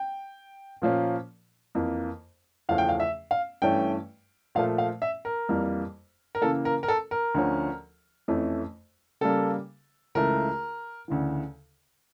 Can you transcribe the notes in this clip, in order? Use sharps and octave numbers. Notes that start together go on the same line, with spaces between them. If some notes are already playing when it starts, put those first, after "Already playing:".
Already playing: G5
A#2 F3 A#3 C#4
F2 E3 A#3
E2 C#3 F3 A3 C#4 F5
G5
F5
E5
F5
G2 E3 A3 C#4 G5
A#2 F3 A3 F5
F5
E5
A#4
F2 E3 G3 A#3
A#4
C#3 E3 A#3 A4
A#4
A#4
A4
A#4
D2 D3 F3 C#4
F2 E3 A3 C#4
C#3 G3 A#3 A4
C#2 C#3 E3 A3 A#4
D2 C#3 E3